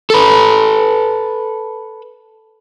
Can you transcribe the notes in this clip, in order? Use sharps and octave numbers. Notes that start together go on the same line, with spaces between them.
A4 B4